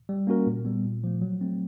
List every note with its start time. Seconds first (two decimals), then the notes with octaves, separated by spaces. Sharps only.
0.09 G3
0.27 A#3 C#4 F#4 A#4
0.47 A#2
0.65 G3 B3
0.85 A#2
1.04 F3 A3
1.22 F#3
1.41 A3 C4